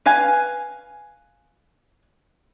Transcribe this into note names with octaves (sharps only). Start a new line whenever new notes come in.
B4 F5 G#5